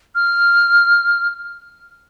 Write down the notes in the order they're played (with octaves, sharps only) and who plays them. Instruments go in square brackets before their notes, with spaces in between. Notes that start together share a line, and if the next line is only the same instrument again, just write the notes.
[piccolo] F6